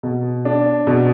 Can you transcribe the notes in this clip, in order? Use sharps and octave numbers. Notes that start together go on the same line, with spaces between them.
B2
D4
B2